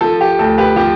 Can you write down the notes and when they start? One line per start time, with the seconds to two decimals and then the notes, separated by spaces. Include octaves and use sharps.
0.01 F3 A4
0.21 G4
0.39 D2 A4
0.58 G4 B4
0.76 F3 G4